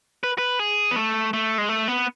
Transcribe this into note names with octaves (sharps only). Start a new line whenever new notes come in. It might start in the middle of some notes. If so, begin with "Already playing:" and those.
B4
B4
G#4
B3
A3
A3
G#3
A3
B3